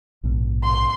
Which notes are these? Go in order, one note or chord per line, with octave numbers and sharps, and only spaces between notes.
A#1 G#2 B2
C6